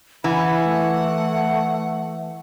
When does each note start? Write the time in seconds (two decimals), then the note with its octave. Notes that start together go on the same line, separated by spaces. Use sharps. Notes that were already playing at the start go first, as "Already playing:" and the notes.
0.24 E3 F#5 B5
0.64 A3